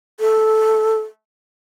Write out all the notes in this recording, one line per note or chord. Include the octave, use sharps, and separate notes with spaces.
A4